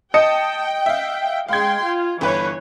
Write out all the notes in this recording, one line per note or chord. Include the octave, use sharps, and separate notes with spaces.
D#5 G5 A5 D#6 C#7
E5 F5
G#3 F5 G5 C6 G#6
F4
G1 E3 B4 C#5 F#6